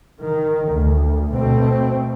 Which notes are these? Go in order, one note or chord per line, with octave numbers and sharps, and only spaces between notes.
D#3
D2
B2 A3 C4